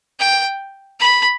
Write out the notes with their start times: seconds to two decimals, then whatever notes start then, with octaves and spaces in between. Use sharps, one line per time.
0.19 G5
1.00 B5